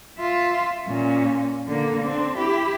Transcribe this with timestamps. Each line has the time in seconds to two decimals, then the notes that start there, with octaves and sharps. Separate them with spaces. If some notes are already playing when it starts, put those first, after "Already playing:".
0.19 F4 E5
0.86 A#2 C#4
1.67 D3 A#3
2.04 C4 D4
2.37 E4 G4